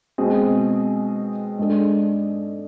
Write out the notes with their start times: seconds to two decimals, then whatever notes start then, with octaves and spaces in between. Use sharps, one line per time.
0.18 B2 G#3 C4 G#4
1.59 G#2 G#3 D4 A4